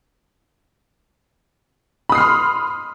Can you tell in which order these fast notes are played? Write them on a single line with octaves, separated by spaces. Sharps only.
B5 D#6 C7 F6 C6